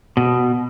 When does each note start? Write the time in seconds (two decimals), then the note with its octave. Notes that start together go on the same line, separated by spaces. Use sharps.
0.17 B2